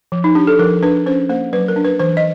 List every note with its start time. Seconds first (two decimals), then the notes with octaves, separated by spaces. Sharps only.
0.12 F3
0.24 D#4
0.35 D4 G4
0.47 A4
0.59 F3 A#4
0.83 D4 B4
1.06 C#4 C5
1.29 A#3 C5
1.53 F#3 B4
1.68 A#4
1.76 D4
1.84 B4
1.99 E3 C5
2.17 D#5